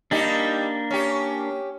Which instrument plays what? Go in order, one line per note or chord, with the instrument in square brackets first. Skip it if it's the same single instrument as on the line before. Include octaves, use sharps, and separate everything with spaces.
[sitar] G3 D#4 G4 [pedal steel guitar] A#3 D4
[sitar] C#4 G4